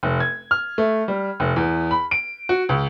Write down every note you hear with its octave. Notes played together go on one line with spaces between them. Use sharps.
F1
G#6
F6
A3
G3
F1
E2
B5
D7
F#4
C#2